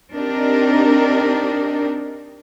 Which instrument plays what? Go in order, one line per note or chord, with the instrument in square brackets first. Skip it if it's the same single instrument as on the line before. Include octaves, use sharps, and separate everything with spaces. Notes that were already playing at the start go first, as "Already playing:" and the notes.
[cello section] C4 D4 D#4 G4 A#4